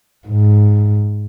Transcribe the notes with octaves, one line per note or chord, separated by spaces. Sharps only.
G#2